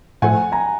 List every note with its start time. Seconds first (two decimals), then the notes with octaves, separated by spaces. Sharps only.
0.22 A2 F3 A3 F#5 G#5
0.52 G#5 A#5